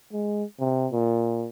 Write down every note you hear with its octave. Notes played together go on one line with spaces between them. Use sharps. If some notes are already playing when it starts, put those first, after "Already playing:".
G#3
C3
A#2